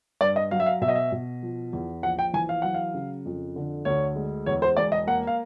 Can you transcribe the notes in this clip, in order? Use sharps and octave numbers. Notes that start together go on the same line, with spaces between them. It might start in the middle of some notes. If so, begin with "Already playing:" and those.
G2 D5
D#5
F#3 F5
E5
F5
B2 E5
D#5
E5
B2
F3
E2
A#1 F#5
G5
E3 G#5
F5
F#3 F#5
F5
C#3
F2
D3
D2 C#5
G#3
E2 C#5
C5
E1 D5
D#5
A#3 F#5
F5